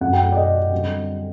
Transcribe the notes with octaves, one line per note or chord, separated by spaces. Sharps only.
F#2 F#3 A3 F#5
G5
D5
D#5
D3 G3 C4